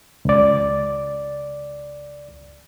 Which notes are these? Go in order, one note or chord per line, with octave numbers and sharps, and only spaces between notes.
C#2 D5